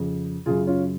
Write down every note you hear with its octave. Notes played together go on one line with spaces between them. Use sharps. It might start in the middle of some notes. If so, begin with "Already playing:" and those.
Already playing: F2 C#3
F#2 C#3 F4 G#4
C#4 F4